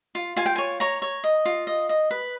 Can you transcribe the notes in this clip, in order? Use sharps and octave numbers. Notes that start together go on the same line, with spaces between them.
F4
F4 G#5
G5
G#5
C#5
C#5 A#5
C#5
D#5
F4
D#5
D#5
B4